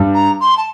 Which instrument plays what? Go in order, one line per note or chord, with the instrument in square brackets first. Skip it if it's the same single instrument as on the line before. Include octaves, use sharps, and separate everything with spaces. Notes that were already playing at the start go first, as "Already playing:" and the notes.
Already playing: [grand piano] G2 G3
[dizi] A#5
C6
A5